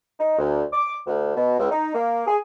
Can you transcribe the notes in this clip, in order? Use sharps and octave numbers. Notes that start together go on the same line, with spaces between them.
D#4
D2
D6
D2
B2
C#2
D#4
A#3
G#4